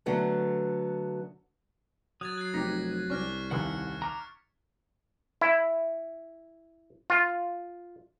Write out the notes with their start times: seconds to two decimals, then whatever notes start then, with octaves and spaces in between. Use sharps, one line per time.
0.06 D3 F#3 A3 B3
2.21 F#3 D#6 F#6 G#6 A6
2.38 F#6 A6 C7
2.54 F1 D#4 G4 A#6 B6
3.10 C2 C#4 D4 C#6 F6 A#6
3.51 A1 D#2 F#5 F#6 C#7
4.02 A#5 D6 F6
5.41 E4
7.10 F4